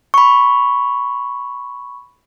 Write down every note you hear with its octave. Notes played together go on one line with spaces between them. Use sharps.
B5 C#6